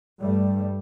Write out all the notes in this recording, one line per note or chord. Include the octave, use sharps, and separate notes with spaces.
G2 G3 A3